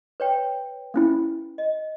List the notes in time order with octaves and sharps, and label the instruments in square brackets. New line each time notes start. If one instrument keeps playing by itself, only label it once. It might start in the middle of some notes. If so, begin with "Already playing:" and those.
[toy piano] B4 C#5 G5
[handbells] A#3 C#4 E4
[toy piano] D#5